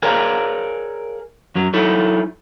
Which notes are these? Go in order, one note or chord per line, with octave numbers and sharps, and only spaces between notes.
G#4 A#4 C#5 D5 F5 A#5
F#2 F#3
F#3 D#4 E4 A4 C#5